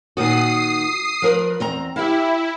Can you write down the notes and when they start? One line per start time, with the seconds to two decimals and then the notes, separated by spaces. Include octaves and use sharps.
0.17 A#2 D#3 F#4 D#6 C7
1.22 F3 A#4 B4
1.60 E2 C4 A#5
1.96 E4 G4 F5